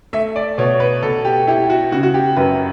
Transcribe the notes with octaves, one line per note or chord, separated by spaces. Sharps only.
A3 E5
D5
B2 C#5
B4
B2 A4
G4
E4 G4
F#4
C#3 F#4
F#4
G4
F#2 B4